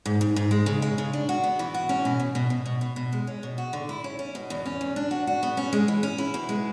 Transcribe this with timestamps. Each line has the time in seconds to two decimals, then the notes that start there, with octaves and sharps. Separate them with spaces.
0.06 G#2
0.21 G#2
0.36 G#2
0.51 G#3
0.66 C#3
0.82 G#3
0.98 C#3
1.13 D4
1.29 F#4
1.44 B3
1.59 E3
1.74 F#4
1.89 C#4
2.05 B2
2.20 B2
2.35 B2
2.50 B2
2.66 B2
2.81 B2
2.96 B2
3.13 G#3
3.27 C#4
3.43 B2
3.58 F#4
3.73 D3
3.89 E4
4.04 C#4
4.19 C#4
4.35 B2
4.50 E2
4.66 C#4
4.81 E2
4.96 D4
5.11 F#4
5.27 F#4
5.43 B3
5.57 C#4
5.73 G#3
5.88 E3
6.03 C#4
6.18 E4
6.34 B2
6.49 G#3